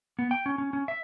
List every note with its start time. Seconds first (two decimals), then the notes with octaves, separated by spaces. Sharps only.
0.19 B3
0.31 G5
0.46 C#4
0.58 C#4
0.73 C#4
0.88 E5